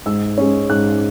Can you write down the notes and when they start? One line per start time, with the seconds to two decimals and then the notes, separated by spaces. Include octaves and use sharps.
0.06 G#2 E6
0.38 G#3 C#4
0.69 G#2 F#6